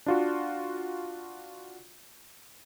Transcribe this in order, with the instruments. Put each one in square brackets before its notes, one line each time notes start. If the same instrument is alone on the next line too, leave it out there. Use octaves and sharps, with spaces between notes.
[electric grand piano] D4 F4 F#4